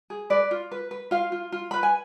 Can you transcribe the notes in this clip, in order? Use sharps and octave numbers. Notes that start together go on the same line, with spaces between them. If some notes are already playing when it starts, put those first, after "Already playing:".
G#4
B4 D5
F4
B4
B4
F4 F5
F4
F4
B4 B5
G#5